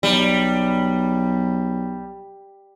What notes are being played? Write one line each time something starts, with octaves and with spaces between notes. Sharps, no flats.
B1 G3